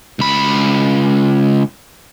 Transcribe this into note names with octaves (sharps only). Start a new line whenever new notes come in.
C#2 B5